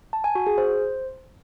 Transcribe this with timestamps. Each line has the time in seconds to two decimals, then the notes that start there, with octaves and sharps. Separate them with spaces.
0.13 A5
0.24 G#5
0.35 F#4
0.47 G#4
0.58 C5